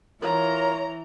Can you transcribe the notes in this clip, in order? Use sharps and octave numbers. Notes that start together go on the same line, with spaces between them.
E3 F4 A#4 C#5 A#5